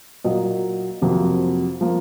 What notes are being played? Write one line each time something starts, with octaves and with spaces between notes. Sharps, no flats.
A#2 F#3 A#3 D#5
F2 C3 F#3 A#3
F3 A#3